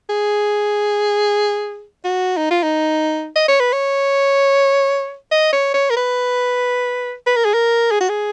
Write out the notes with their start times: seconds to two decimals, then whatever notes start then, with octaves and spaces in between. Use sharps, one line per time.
0.09 G#4
2.04 F#4
2.37 D#4
2.51 F4
2.63 D#4
3.36 D#5
3.48 C#5
3.60 B4
3.73 C#5
5.31 D#5
5.53 C#5
5.74 C#5
5.90 A#4
5.97 B4
7.27 B4
7.36 A#4
7.45 G#4
7.54 A#4
7.91 G#4
8.01 F#4
8.09 G#4